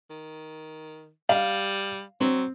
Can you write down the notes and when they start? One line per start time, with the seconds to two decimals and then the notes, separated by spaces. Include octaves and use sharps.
0.10 D#3
1.29 G3 F5
2.21 F#3 C4